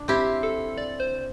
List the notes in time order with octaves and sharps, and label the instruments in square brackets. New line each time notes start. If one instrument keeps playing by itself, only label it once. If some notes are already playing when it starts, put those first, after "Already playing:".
Already playing: [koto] D4
[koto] C4 E4 [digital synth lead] G4
[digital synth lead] A4
D5
C5